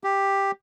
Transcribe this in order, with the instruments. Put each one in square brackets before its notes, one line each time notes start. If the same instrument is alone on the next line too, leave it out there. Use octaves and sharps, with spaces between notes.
[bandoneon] G4